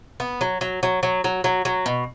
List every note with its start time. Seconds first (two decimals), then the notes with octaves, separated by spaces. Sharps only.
0.20 B3
0.41 F#3
0.61 F#3
0.83 F#3
1.03 F#3
1.24 F#3
1.44 F#3
1.65 F#3
1.86 B2